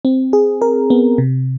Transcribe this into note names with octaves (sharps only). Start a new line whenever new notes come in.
C4
G#4
A#4
B3
C3